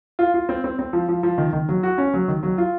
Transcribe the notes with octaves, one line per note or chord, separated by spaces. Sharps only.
F4
F4
C4
C4
C4
F3
F3
F3
D#3
D#3
F#3
F#4
C#4
F#3
D#3
F#3
F4